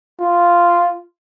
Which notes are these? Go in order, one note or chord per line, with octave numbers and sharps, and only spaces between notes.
F4